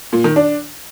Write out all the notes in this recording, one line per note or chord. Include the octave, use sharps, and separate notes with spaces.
A#2
D#3
D4